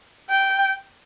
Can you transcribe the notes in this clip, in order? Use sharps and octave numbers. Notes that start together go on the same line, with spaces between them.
G5